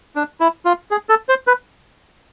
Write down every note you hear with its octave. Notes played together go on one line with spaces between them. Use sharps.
D4
E4
F4
G#4
A4
C5
B4